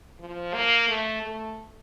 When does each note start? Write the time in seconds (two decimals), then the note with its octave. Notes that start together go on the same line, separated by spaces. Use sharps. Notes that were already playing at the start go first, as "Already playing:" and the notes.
0.20 F3
0.54 A#3
0.89 A3
1.23 A3